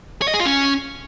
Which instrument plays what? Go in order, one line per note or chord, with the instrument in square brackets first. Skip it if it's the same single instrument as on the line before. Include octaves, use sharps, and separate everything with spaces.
[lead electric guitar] C#5
D#5
G#4
F4
C#4